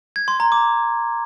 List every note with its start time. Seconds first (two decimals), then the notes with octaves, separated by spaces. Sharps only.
0.16 G#6
0.28 C6
0.40 A#5
0.52 D6